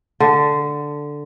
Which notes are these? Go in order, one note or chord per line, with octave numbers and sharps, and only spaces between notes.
D3